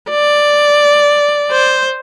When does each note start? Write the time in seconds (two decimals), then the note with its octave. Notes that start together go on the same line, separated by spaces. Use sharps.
0.10 D5
1.52 C5